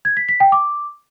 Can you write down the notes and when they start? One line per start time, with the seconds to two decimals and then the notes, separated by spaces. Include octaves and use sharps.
0.05 G#6
0.17 B6
0.29 B6
0.40 G5
0.52 D6